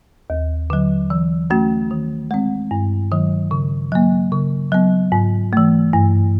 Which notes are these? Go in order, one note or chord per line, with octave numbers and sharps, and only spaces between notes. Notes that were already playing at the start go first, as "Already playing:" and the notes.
D#2
D3 F#3
E3
A3 C#4 F#4
D#3
G#3 C4
G2
D#3 F#3
C#3
F#3 A#3
C#3
F#3 B3
G#2
E3 A3
G2